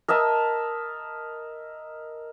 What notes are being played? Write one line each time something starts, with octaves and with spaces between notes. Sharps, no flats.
A#4 D#5 E5 A5